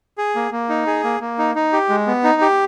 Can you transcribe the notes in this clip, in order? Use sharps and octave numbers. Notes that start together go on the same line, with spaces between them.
G#4
A#3
A#3
D#4
G#4
A#3
A#3
D#4
D#4
G4
G#3
B3
D#4
G4